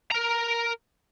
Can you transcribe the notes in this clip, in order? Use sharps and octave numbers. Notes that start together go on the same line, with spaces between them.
A#4 A#5